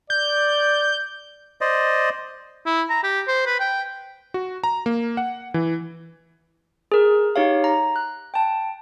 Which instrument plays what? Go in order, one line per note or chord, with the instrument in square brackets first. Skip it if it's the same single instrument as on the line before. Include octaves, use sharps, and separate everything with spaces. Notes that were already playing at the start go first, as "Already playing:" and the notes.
[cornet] D5 [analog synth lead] G6
[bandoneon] C5 D5 D#5
[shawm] E4
A#5
G4
C5
B4
G5
[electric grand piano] F#4
A#5
A#3
F#5
E3
[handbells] G#4 A#4
D#4 G4 C#5 F5
A#5
F#6
G5 A5